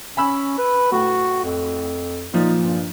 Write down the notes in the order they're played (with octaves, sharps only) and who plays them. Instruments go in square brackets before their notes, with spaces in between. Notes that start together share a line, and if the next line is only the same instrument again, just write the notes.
[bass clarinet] C#4 [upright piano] G#5 B5 E6
[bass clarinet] B4
[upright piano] A2 [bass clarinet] F#4
[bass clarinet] F2
[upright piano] A#2 F3 [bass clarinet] D#4
[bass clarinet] G2